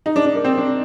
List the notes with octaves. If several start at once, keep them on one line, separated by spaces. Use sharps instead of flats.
D#4
D4
D4
A#3
C4
D4